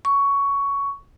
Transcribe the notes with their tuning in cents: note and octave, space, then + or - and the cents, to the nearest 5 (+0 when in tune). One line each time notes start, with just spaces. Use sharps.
C#6 +10